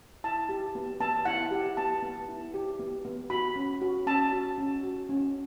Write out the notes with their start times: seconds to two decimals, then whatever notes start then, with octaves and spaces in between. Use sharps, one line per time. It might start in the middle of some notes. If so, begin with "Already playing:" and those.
0.24 E4 A5
0.49 G4
0.75 B3
1.00 B3 A5
1.25 E4 F#5
1.51 G4
1.77 B3 A5
2.02 B3
2.28 E4
2.54 G4
2.79 B3
3.05 B3
3.30 F#4 B5
3.56 C#4
3.82 F#4
4.07 C#4 A5
4.32 F#4
4.58 C#4
4.83 F#4
5.09 C#4